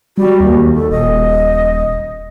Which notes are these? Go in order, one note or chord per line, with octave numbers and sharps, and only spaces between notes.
G3 F#4
D#2
A4
D#1 D#5